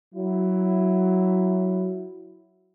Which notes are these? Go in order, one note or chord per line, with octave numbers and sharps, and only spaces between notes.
F#3 E4